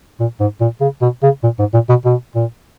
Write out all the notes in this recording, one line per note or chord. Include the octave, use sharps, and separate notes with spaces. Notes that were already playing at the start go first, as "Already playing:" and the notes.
A#2
G#2
A#2
C#3
B2
C#3
A#2
G#2
A#2
B2
B2
A#2